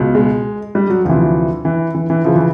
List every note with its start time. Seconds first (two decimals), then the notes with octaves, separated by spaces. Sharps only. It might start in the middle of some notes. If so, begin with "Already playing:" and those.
Already playing: C#2 B2
0.15 G#3
0.75 G3
0.90 F#3
1.05 D2 C3 E3 F3
1.65 E3
1.95 E3
2.10 E3
2.25 C#3 E3 F3
2.36 E3